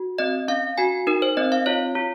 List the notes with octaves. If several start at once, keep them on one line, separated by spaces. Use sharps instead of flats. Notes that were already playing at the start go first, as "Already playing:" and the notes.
Already playing: F#4
C4 D#5
C#4 F5
F#4 G#5
D#4 A#4
C5
C4 D#5
F5
F4 C#5
F4